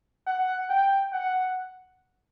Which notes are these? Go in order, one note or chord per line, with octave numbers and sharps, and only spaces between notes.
F#5
G5
F#5